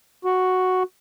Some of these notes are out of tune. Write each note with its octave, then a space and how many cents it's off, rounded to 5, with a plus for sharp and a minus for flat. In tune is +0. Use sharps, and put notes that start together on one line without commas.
F#4 +0